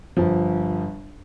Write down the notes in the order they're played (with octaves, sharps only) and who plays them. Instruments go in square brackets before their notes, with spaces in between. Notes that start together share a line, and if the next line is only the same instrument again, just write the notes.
[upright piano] G1 F3